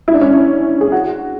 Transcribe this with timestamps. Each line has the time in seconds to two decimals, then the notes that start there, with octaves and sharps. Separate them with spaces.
0.08 E4
0.14 D4
0.21 C#4
0.29 D4
0.81 G#4
0.92 F#4